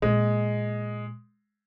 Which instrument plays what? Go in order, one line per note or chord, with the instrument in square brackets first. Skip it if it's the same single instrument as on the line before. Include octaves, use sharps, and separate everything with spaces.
[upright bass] A#2 A#3 [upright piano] G#3